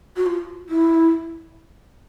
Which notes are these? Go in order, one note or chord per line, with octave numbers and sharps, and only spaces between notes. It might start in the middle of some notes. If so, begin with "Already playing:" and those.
F#4
F4
E4